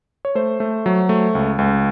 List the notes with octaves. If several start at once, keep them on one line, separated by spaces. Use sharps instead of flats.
C#5
A3 C5
A3
F#3
A3
C#2
C#2